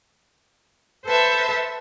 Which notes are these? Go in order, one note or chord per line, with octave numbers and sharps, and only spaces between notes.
A4 B4 C5 E5 A5